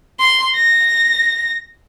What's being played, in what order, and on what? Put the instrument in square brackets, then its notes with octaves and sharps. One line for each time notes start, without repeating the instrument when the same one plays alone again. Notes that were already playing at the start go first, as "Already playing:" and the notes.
[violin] C6
A#6